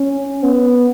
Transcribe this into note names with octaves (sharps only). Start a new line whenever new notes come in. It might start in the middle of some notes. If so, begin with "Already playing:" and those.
Already playing: C#4
B3